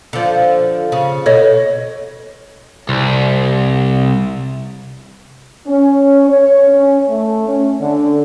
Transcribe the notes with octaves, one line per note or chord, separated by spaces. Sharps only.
D3 F3
C#3
B2 A4 C#5 D#5
C2
C#4
C#5
C#4
A3
C#4
D3